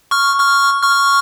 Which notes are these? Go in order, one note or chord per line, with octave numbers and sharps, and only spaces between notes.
C#6 F6
C#6 F6
C#6 F6